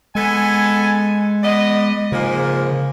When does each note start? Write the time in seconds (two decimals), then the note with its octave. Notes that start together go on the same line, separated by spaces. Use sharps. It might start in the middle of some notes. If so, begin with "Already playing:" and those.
0.15 G#3 B3 A4 G#5
1.44 B3 D5 D#5
2.12 G#2 C#3 F3 A#3